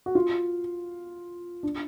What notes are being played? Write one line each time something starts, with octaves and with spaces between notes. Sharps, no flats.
F#4
F4
D4